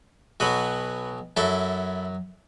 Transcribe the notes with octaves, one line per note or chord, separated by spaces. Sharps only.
B1 B2 F#3 F#4 B4
F#2 F#3 E4 A4